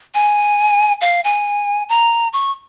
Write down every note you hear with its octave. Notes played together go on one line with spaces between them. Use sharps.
G#5
F5
G#5
A#5
C#6